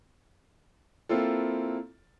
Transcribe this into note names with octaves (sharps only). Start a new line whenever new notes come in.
A#3 C4 E4 F4 A4